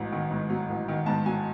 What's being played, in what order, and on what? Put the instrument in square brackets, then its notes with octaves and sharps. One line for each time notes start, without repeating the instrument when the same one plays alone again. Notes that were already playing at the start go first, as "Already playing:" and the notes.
Already playing: [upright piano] A1 G#2 F#3
D#3
G#2
F#3
A1
D#3
G#2 A5
F#3 G#5